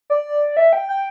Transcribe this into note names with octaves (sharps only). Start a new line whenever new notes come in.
D5
E5
G5
G5